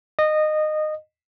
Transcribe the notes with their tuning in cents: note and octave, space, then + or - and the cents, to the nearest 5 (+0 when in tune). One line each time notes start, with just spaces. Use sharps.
D#5 -20